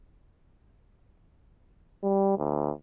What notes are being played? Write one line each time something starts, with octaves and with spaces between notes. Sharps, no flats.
G3
D2